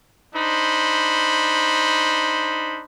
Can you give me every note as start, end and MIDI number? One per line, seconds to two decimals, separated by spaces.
0.34 2.83 62
0.34 2.83 63
0.34 2.83 72
0.34 2.83 83